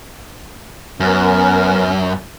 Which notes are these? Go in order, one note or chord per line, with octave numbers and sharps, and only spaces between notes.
F#2 B3 C#4 A#4